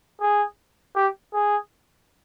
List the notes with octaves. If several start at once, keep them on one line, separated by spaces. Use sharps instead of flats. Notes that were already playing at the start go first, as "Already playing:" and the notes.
G#4
G4
G#4